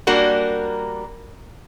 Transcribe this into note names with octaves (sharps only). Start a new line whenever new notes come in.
G3 A#3 D4 F#4 A#4